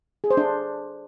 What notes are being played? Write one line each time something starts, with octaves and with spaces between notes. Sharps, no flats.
G#4
C5
D4